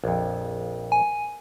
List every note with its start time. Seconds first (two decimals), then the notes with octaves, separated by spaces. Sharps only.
0.04 A#1 F2
0.92 G#5